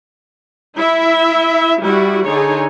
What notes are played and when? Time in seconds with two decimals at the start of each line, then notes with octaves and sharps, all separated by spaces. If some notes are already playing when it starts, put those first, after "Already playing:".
0.77 E4 E5
1.81 G3 E4 F#4
2.25 D3 D#4 G#4 C#5